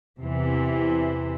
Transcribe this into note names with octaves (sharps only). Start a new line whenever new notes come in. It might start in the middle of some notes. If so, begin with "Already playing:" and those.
E2 C3 E3